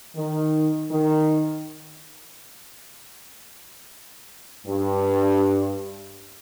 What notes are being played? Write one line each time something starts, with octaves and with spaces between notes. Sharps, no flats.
D#3
D#3
G2